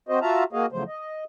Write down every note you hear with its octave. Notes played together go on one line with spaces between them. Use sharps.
C4 F#4 C5 D#5
F4 F#4 E5 F5 A5 A#5
A#3 F#4 G#4 D#5 F5
E2 C#3 F3 F#3 A3 C5
D#5